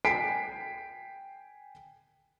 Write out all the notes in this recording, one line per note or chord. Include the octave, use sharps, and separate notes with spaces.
G5 G#5 B6 C7 D7